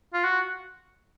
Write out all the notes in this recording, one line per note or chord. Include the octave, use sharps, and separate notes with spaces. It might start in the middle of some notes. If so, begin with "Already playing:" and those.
F4
F#4